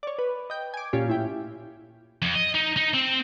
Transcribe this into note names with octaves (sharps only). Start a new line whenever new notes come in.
C#5 D5
B4
D#5 G5
G#5 D6
A#2 C#4 F4 G4
A2 E4 G5
F2
D#5
D#4
D#4
C4